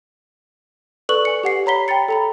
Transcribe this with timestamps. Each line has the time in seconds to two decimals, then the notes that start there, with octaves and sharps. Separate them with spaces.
1.09 A4 B4 D5 C#6 F#6 F#7
1.25 G#5 C#7
1.44 G4 F#5 C7
1.66 C#5 A#5 B5 B6 G7
1.88 G5 A#5 B5 A6 C#7
2.08 A4 A#5 B5